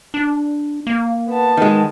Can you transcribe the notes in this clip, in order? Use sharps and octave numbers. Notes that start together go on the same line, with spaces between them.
D4
A#3
B3 A5
D#3 G#3